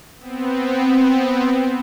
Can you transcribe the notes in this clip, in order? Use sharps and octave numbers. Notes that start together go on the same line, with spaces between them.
B3 C4